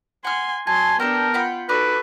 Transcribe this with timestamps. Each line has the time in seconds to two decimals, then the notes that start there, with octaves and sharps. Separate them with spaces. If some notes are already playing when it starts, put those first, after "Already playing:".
0.25 F#5 G#5 C6 F6
0.67 F#3 G#5 A5 C6
1.00 B3 D4 G4 A4 A#4 G5
1.34 F4 F#5 G5 B5
1.69 D#4 F#4 A4 B4 D5